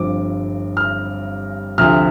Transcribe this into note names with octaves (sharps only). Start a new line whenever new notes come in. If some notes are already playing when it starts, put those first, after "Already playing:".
Already playing: G1 G2 F3 C4 D6
F6
D2 C3 F3 F6